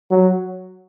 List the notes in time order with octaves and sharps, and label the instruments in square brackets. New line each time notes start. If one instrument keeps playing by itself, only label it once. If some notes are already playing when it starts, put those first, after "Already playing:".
[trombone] F#3